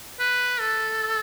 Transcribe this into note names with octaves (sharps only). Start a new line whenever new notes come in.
B4
A4